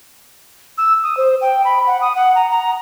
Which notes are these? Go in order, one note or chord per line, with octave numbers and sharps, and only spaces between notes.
E6
D#6
C5
G5
B5
F#5
D#6
F#5
A#5
A#5